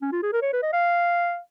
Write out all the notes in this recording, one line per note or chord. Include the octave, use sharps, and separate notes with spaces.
C#4
F4
G#4
A#4
C#5
B4
D#5
F5